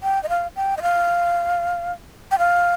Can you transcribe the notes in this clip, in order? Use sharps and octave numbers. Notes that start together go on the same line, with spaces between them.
G5
D#5
F5
G5
D#5
F5
G5
F5